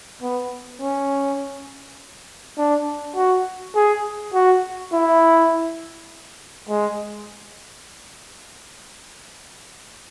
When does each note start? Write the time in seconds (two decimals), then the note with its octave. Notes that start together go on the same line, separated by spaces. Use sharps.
0.22 B3
0.81 C#4
2.58 D4
3.16 F#4
3.75 G#4
4.34 F#4
4.93 E4
6.69 G#3